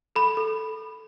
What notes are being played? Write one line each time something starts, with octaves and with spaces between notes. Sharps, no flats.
A4 B5
A4